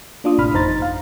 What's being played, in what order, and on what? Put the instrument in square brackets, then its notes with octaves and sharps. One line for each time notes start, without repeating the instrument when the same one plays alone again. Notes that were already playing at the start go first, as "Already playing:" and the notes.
[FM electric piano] A#3 D4 F4 D#6
A1 A2 C3 B5 F6
G#1 F2 D#4 C5 A#5 A6
F5